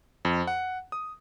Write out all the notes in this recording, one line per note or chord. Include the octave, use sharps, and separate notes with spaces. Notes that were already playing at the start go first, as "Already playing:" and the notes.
F2
F#5
D#6